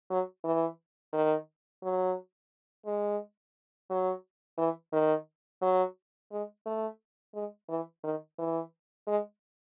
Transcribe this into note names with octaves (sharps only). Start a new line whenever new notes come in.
F#3
E3
D#3
F#3
G#3
F#3
E3
D#3
F#3
G#3
A3
G#3
E3
D#3
E3
G#3